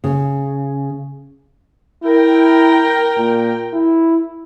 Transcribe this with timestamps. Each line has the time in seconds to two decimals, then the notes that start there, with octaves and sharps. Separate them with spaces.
0.04 C#3
2.04 E4 A#4 G5
3.17 A#2
3.74 E4